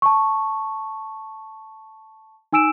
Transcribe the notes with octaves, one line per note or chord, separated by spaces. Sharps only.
A5 C#6
D#4 G#5 E6 D7 E7